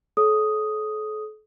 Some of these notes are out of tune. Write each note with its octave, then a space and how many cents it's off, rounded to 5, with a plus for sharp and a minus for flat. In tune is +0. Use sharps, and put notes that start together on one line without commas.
A4 -40 C#5 -15 D#6 +0